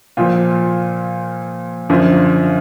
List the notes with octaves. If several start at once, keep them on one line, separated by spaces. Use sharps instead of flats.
A#2 F3 F4
F#2 D3 F3 F4